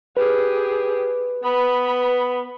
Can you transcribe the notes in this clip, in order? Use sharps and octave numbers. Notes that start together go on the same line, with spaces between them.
G4 G#4 B4
B3 B5